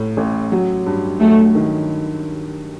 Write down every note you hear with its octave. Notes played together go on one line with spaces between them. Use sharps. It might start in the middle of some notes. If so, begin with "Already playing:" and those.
Already playing: A2
A1
F#3
G2
F#3 A3
D#3